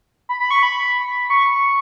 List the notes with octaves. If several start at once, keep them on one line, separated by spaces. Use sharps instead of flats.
B5
B5
C#6
B5
C#6